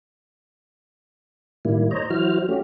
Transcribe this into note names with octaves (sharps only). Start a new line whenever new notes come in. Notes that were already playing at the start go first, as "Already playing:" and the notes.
A2 D#3 G3 A#3 E4
C5 C#5 D#5 A#5
E3 F#3 E4 F#4 C5 F6
A3 C#4 F#4 G4